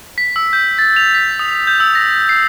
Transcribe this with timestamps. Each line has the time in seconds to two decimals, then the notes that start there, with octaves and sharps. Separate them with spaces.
0.18 B6
0.36 E6
0.53 G6
0.78 A6
0.96 F7
1.14 B6
1.39 D#6
1.67 G6
1.80 E6
1.95 A#6
2.29 C7